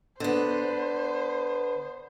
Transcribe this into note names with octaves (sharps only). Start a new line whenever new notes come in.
D3 B3 C5